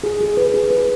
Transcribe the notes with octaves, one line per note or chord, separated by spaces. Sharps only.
G#4
G#4
B4
G#4
B4